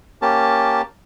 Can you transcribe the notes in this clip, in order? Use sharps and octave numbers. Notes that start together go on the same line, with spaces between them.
A#3 C#4 G4 A5